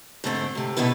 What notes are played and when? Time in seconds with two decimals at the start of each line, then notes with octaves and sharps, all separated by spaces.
0.24 G#2 D3 A3 C4
0.55 A2 C3
0.77 B2 D3 D#3 B3 E4 B4